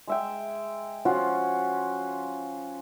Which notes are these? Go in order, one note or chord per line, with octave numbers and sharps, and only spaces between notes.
G#3 E5 G5
F3 C#4 F4 F#4